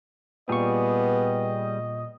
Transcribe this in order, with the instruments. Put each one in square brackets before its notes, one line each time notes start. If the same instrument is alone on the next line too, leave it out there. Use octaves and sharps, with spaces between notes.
[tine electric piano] A#2 C#6 [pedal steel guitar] G3 G#4 [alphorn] B3 [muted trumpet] D#5